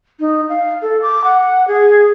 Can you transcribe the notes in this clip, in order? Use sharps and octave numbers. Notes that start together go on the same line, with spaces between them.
D#4
F5
A4
D6
F#5
G#4